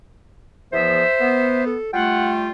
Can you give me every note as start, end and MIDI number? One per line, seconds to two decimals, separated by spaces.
0.72 1.03 40
0.72 1.03 53
0.72 1.03 59
0.72 1.62 72
0.72 1.62 76
1.21 1.74 59
1.66 1.91 69
1.93 2.50 55
1.93 2.50 57
1.93 2.50 65
1.93 2.32 78
1.93 2.51 79